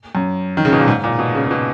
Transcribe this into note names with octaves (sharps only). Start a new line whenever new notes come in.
F#2
D#3
C#3
B2
A#2
G#2
A#2
B2
C#3
C#3
B2